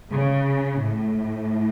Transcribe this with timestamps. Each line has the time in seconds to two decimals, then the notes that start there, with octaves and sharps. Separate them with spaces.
0.11 C#3
0.81 A2